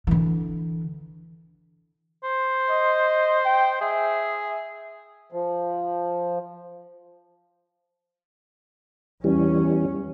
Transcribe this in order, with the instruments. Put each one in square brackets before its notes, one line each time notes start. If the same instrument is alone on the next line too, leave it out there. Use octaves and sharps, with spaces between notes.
[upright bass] D3 E3
[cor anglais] C5
[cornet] D#5
G5
[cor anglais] G#4 [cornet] E5
[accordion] F3
[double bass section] E2 C#4 [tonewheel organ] E3 G3